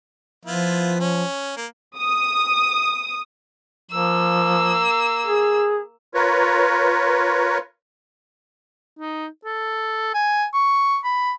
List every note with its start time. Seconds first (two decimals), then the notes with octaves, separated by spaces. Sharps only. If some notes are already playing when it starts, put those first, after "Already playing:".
0.45 F3 B3 E4 F4
1.00 C#4
1.57 A#3
1.99 D#6
3.91 F3 A#3 E6
5.26 G#4
6.14 F4 A#4 B4 C#5
8.99 D#4
9.45 A4
10.14 G#5
10.54 C#6
11.04 B5